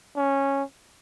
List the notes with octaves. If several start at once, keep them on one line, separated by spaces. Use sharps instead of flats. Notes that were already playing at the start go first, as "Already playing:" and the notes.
C#4